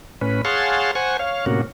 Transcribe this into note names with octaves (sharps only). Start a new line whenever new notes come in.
A2 C#4 B4
G#4 C#5 F5 F#5 A5 C6
C5 F#5 G#5 C#6
C#5 F5
A2 C3 A#3 C#4 F#4